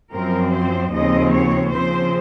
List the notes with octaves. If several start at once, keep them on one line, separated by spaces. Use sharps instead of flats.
F#2 F3 C4 A#4
C5
D#2 C#3 F3 C4 D#5
C#5
C#3 F3 C4 C5